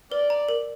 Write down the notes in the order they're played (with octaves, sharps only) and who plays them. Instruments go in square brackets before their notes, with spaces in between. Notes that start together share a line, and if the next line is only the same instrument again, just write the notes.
[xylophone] B4 [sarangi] D5
[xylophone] A#5
A#4